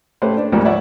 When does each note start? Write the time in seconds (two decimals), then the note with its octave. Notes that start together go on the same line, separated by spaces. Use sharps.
0.22 A3 C#4 G4 B4 C5
0.37 D4
0.52 D2 G#2 F3 G3 A#3
0.65 C#5 D5 E5 F#5